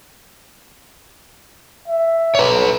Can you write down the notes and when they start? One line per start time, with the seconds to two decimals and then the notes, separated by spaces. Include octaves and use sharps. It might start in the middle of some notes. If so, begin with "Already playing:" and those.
1.88 E5
2.35 B4 C#5